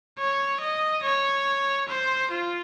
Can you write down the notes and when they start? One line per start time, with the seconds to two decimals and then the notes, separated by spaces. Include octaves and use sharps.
0.18 C#5
0.61 D#5
1.03 C#5
1.88 C5
2.31 F4